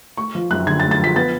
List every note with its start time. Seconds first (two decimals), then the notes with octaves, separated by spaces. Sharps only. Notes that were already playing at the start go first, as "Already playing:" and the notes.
0.17 A3 C#6
0.35 F3
0.51 F#2 F#6
0.67 D3 G#6
0.80 A6
0.83 A3
0.91 A6
1.00 F3 B6
1.16 B3 A6